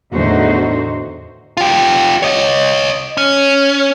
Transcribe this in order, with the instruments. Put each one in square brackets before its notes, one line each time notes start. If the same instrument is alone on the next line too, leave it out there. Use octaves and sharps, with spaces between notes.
[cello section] E2 A2 D3 D#4 F#4 C5
[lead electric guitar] F4 G4
C#5 D#5
C#4